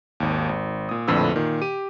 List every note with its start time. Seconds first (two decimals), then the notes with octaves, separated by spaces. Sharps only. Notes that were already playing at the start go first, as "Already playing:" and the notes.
0.20 G#1 D#2
0.49 G#1
0.89 A#2 D#6
1.08 A#1 F2 A2 D3 B4 E6
1.36 A#2 D#3
1.62 G4 D#7